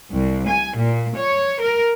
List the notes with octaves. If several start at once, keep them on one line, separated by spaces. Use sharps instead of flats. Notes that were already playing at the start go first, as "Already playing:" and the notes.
C2
G#5
A#2
C#5
A#4